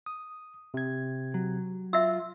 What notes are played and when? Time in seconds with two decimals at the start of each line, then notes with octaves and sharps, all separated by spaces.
0.06 D#6
0.74 C3 G#6
1.34 F#3
1.93 F4 E5 E6